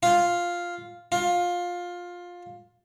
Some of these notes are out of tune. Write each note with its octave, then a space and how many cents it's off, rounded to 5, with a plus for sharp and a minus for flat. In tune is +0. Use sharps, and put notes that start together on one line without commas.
F4 +0
F4 +15